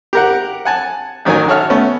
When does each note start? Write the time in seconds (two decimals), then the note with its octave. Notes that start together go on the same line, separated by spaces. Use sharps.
0.13 G4 A#4 F#5
0.65 F#5 G#5 A5
1.25 A1 D#3 F#3 A#4 G#5
1.48 F#4 A4 C#5 E5 F6
1.70 A3 B3 C#4